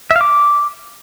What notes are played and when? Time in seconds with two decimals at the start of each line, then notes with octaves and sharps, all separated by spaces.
0.11 E5
0.16 F5
0.21 D6